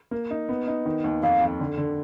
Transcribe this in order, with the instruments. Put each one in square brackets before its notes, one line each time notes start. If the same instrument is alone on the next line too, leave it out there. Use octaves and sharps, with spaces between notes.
[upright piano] A#3
D#4
B3
D#4
D#3
D#2
[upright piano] F2 [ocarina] F5
[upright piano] F2
D3
D3